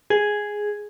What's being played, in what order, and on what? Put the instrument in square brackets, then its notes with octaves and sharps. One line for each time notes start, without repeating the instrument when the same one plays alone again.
[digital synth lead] G#4